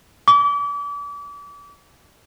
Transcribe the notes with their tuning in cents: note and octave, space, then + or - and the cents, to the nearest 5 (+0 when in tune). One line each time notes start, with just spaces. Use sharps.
D6 -35